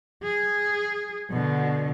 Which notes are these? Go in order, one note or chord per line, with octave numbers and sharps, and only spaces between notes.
G#4
B2 D3